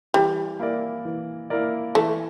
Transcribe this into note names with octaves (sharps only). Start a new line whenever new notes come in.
E3 G3
A#3 E4 A#4 D5
E3
A#3 E4 A#4 D5
E3 A3